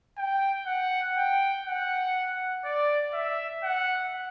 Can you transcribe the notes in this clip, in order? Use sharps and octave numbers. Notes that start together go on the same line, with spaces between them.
G5
F#5
G5
F#5
D5
E5
F#5